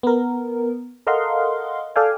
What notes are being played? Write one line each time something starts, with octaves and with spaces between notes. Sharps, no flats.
B3 A#4
A4 A#4 D#5 F5 F#5 C6
A4 D5 F5 G5 G#5